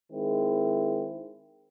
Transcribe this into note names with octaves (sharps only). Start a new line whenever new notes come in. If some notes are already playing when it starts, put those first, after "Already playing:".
D#3 G#3 C4 E4